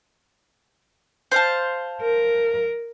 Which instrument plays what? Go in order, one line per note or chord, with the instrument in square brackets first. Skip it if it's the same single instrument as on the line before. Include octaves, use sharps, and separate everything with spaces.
[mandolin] C5 F5 A5
[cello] A#4